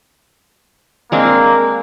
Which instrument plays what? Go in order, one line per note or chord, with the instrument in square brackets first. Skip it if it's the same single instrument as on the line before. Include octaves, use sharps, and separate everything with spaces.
[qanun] G#3 C4 D4 [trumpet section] A#3